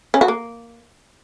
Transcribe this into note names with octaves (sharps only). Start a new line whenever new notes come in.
C#4
F#4
A#3